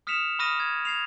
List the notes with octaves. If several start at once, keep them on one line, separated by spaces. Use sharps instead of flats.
D#6 F6 B6 C#7 E7 F7
B5 C#6 D#6 F6 A#6 D#7
G#6
G#6 C7 F7